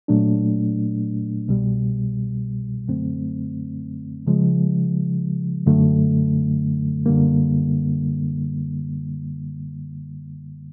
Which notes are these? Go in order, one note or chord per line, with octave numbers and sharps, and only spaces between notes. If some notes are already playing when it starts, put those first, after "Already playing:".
A#2 F#3 A3 D4
C2 B2 G3
F#2 D3 F#3 A3 C4
C#3 F3 G#3
F#2 D3 F#3 A3
F#2 D3 G3 A#3